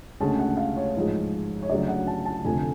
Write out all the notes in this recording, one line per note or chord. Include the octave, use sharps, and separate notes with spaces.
D2 C#3 G#3 C#4 A5
F#5
F5
C#5
A1 G#2 F3 G#3
C#5
D2 C#3 F#3 D5
F#5
A5
A5
F1 F2 D3 G#5